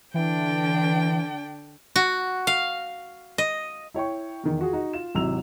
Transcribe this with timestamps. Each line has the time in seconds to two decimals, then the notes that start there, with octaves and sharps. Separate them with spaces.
0.14 D3 E3 D4 G5
1.96 F#4
2.47 F5
3.38 D#5
3.94 E4 C#5 G5 C#6
4.43 E2 D#3
4.59 F4 F#4 G#4
4.73 D#4 F#4
4.93 F4 E7
5.15 G#1 C3 F#3 E4 E6 F7